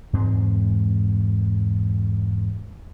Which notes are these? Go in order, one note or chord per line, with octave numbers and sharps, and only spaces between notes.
E2 G#2 G#3 C4